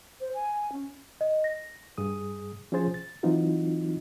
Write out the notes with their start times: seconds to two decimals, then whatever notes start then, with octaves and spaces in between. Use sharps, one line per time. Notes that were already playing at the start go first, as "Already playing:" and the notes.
0.20 C5
0.34 G#5
0.72 C#4
1.21 D#5
1.44 A#6
1.98 G2 G#4 D#6
2.72 F3 C#4 F4 G#4 C5 A6
2.94 A6
3.23 E3 F#3 C4 D#4 F4 F#4